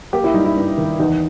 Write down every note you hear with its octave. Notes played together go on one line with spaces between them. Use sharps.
A#3 G4
E4
G3 D#4
E4
G2
D#3
E2 D#4